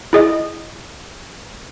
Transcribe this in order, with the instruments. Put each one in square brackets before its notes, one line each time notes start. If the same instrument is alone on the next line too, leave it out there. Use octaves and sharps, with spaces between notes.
[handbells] E4 G#4 D#5